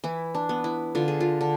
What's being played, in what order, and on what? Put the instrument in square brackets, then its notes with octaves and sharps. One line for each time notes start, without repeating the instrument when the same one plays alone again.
[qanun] E3 E4
D4
B3
E4
D3 F4
G#4
F4
D3